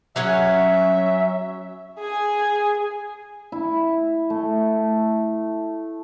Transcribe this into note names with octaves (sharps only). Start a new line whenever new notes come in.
F#3 C#4 E5 F#5
G#4 G#5
E4
A3